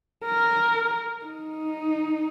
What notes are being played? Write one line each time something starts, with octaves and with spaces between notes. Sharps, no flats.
A#4
D#4